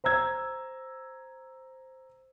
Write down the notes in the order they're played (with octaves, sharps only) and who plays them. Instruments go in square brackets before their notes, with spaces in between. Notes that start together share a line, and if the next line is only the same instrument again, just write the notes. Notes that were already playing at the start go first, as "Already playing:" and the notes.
[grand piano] C5 A#5 E6 G#6